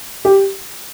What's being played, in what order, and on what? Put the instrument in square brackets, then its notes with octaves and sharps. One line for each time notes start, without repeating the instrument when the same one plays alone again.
[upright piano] G4